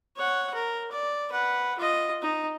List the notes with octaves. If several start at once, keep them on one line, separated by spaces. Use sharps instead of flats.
C#5 F#5
A#4
D5
B4 F#5
F4 D#5
D#4